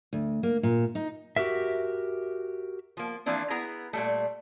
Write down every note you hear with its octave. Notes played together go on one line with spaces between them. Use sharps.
D2
A#3
A#2
D#4
F#4 G4 A#4 E5
F3 A#3
E3 F3 A#3 C4 D4 E4
B3 E4 G#4 A#5
A#2 G3 A3